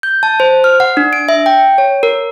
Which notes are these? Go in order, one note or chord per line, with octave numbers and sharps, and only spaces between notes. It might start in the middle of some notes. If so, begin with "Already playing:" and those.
G6
A5
C5
F6
F#5
D4
D7
E5
G5
C#5
A#4